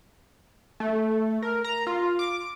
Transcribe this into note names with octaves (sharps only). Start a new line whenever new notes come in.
A3
A#4
A#5
F4
D6